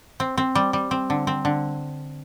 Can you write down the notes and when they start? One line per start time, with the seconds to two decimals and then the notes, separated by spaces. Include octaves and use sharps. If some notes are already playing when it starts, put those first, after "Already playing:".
0.20 C4
0.38 C4
0.55 G3
0.73 G3
0.91 C4
1.10 D3
1.27 C4
1.45 D3